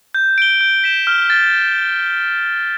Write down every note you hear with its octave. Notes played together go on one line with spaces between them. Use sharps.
G6
D7 G7
G6
B6 E7 G7
F6
A6